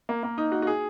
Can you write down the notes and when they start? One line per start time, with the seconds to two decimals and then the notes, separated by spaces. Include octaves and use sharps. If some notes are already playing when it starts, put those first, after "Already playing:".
0.09 A#3
0.23 A#3
0.38 D#4
0.52 F#4
0.62 F#4
0.67 G#4